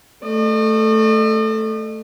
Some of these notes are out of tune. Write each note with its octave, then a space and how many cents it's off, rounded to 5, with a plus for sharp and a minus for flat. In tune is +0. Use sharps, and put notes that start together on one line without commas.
A3 +0 D#5 -45